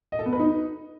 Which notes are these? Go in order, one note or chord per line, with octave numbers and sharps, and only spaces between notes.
D#5
A4
B3
B4
D#4